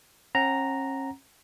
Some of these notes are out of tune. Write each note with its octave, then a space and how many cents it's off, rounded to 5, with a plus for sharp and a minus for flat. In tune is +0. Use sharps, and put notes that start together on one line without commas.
C#4 -40 F#5 +10 A#5 +0